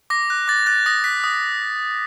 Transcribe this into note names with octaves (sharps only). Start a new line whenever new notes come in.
D6 A#6
F#6
D6 A6
F#6 A6
D#6 A#6
F#6 B6
D#6